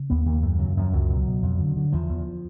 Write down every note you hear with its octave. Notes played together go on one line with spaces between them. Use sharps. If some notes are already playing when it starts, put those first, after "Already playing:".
Already playing: C#3
D#2 B3
D#2 A#3
F#2 A3
C#3 F#3
F#2 F3
C#2 F#3
B2
B2
F2
D3
D3
E2 F3
E2